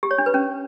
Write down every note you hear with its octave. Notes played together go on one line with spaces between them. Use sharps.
G4
C#5
D4
B4
C#4